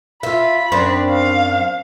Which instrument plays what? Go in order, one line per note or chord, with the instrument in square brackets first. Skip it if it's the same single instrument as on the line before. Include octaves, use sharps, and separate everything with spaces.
[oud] F4 E5 [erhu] B5
[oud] F#2 C4 D4
[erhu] F5